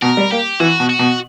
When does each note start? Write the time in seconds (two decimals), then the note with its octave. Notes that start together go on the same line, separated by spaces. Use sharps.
0.02 B2 A#4
0.17 G3
0.31 A#3 G4
0.60 E3 F#4
0.80 B2
0.89 F#4
0.99 B2